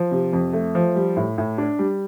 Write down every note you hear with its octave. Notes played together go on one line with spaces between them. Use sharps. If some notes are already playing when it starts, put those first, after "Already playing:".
Already playing: F3
C3
F2
A3
F3
G3
A2
A2
D4
G3